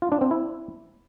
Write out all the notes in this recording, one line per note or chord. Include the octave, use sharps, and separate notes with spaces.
F4
D4
C4
E4